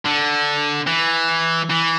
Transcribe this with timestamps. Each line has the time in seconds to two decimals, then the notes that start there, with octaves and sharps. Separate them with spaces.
0.05 D3
0.87 E3
1.70 E3